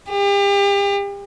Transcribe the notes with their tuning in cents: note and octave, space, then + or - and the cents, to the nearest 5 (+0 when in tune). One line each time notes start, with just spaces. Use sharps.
G4 +35